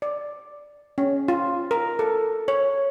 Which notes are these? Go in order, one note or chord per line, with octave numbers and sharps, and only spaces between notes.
D5
C#4
F4
A#4
A4
C#5